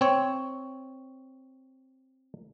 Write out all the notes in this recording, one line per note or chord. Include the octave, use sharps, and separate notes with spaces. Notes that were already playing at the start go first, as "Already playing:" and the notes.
C4 C#5